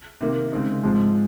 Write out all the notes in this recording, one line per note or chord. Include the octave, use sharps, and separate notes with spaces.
C3 D#3 A#3
C#3 G#3 C4 D#4
G#2 F3 G#3 C4